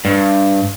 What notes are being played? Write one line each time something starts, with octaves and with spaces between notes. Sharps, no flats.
G2